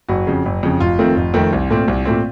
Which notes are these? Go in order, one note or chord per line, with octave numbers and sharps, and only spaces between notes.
F#1 F#4
F2 C#3
F#1
F2 C#3
F1 F4
F2 D#3 A3 C4
F1
F2 D#3 A3 C4
C2
A#2 A3 C4
C2
A#2 A3 C4